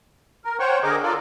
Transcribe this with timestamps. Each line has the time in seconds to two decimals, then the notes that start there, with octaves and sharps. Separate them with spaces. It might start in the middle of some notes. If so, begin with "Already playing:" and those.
0.45 A#4
0.60 C5 C#5 F#5 G5 C#6
0.83 D3 G#4 A#4 D#5 D6
1.03 F4 A4 A#4 D5